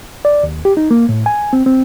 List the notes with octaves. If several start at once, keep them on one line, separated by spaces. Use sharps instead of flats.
D5
D#2
G4
D#4
A#3
A2
G#5
C4
C4